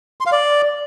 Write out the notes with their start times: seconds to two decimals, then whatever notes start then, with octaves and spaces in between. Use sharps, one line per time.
0.21 C6
0.26 F5
0.32 D5